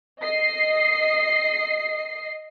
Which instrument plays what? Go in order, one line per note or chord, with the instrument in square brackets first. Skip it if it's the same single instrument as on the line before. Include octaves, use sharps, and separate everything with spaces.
[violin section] D#5 C7